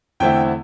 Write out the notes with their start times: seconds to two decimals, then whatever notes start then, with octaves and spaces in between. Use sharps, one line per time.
0.20 E2 D3 A3 C4 E4 G5